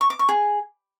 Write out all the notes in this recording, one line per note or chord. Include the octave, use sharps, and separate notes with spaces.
C#6
D6
C#6
G#4